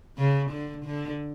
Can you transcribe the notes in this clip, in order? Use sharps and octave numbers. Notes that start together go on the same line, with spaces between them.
C#3
D3
D3